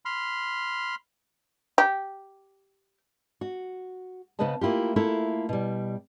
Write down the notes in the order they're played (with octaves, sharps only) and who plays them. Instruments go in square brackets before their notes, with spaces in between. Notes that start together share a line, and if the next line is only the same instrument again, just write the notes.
[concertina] B5 C6 F6
[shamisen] G4
[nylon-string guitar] F#4
C#3 B3 B4 C5 D#5 A5
A3 A#3 E4 F4 G4
A3 A#3 E4 F4 A4
B2 G3